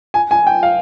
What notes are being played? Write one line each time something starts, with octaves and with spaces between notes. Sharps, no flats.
G#5
G#5
G5
F5